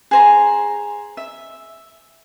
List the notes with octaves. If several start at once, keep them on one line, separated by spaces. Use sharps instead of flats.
G#4 C5 A#5
E5